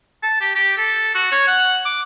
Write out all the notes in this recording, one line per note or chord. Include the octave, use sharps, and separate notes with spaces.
A5
G4
G4
A4
F#4
C#5
F#5
D6